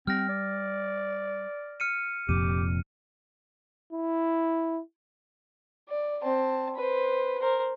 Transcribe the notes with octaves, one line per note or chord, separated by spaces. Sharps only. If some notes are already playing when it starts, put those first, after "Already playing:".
G3 C4 F6 A#6
D5
F6 C#7 D#7
F1 F2 A#2 G4 D#7
E4
D5
C4 A5
B4 C5
A#4 C5